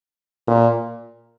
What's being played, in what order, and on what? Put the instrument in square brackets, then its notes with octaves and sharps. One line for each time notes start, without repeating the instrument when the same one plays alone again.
[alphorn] A#2